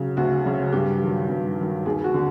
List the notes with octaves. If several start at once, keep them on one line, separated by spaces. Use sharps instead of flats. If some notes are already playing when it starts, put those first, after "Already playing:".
Already playing: C#3 F#3
D2 F#4
C#3 F#3
G2 G4
D#3 F#3
G2
D#3 F#3
D#2 G#4
F#4
D3